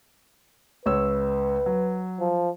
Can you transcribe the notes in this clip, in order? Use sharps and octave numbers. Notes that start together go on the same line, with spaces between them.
C#2 B4 C#5 E6
F#3
F3